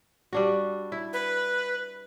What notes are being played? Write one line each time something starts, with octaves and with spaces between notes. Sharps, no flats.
G3 D4 F#4
E4
B4